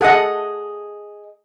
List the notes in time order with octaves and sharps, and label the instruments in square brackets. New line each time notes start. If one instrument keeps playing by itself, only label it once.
[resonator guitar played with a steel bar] G#4 D#5 [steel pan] A4 F#5 D#6